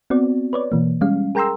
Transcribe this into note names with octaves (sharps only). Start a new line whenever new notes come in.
B3 C4 F#4 D5
B4 C#5 D5
B2 E3 A#3
G3 G#3 C#4 F5
G#4 A#4 G5 A#5 C6 E6